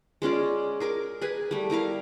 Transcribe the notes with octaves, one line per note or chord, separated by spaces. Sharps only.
G#3 C#4 F4 D5
G#4 A#4 D6
G#4 B4 G#5
G3 A3
G3 E4 A#4 F5